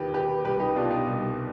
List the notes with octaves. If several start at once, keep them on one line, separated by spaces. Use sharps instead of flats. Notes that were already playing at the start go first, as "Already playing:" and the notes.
Already playing: D#2 D#3 G4 B4
D#2 G4 B4
C2 G4 B4
D#4 G4
B2 D4 F4
D#4 G4
C2